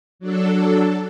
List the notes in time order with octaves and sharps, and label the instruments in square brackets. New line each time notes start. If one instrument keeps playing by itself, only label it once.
[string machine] F#3 D4 A4